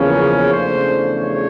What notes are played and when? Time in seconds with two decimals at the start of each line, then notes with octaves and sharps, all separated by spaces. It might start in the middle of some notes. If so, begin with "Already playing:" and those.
Already playing: E2 C#3 F3 A#3 C#4
0.52 E2 C#3 F3 A3 D4 C5
1.19 C#5